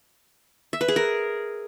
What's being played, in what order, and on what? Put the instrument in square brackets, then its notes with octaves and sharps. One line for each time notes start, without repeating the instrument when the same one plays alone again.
[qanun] E5
B4
G#4
A#4